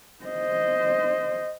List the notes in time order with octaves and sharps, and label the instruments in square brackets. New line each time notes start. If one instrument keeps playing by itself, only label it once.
[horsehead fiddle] C5 D#5